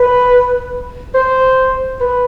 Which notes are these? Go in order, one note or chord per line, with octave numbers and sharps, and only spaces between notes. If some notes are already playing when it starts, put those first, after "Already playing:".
Already playing: B4
C5
B4